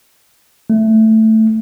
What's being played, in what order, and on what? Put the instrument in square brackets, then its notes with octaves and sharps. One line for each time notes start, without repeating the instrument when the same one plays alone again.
[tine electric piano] A3